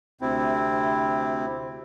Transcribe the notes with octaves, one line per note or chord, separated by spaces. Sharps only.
D2 C3 C4 E4